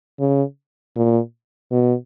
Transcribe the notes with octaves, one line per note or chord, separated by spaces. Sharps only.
C#3
A#2
B2